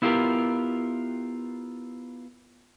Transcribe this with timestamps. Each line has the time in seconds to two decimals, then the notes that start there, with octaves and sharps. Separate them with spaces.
0.02 B3 E4 F4 G4 A#4